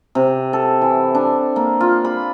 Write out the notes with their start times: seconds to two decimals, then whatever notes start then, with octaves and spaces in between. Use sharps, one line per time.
0.15 C3
0.53 A4
0.82 E3
1.15 D4
1.56 A#3
1.81 F4
2.05 B5